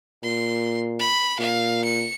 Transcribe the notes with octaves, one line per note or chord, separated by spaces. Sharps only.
A#2 C6
B5
A#2 F5
C#7